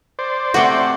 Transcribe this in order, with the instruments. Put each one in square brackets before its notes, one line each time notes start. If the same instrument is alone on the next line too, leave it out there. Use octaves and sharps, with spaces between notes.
[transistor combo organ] C5 D5
[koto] C3 F#4 [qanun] A3 G5